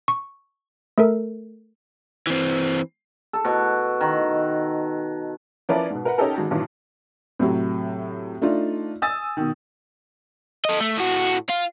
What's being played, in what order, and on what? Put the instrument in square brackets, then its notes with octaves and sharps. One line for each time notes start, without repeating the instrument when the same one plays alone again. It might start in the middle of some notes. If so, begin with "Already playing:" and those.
[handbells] C#6
A3 A4 A#4
[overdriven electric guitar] E3 C4
[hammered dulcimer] A4
B2
D#3
[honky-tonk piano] F3 C#4 E4 A#4 B4 D5
G#2 B2
A#4 B4 F#5
C#4 D#4 G4 A4 A#4
G#1 G#3 F#4 A5
G2 A#2 D#3 E3 F#3
[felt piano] A2 C3 F#3
A3 D4 D#4 F4
G#5 D#6 E6 A6
B2 D#3
[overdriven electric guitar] A4 D#5
A3
A2 F#4
F4